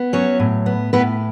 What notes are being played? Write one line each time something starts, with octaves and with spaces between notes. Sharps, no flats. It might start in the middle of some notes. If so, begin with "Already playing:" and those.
Already playing: B3
F#3 C#4 C#5
A2
B3
A2 B3 B4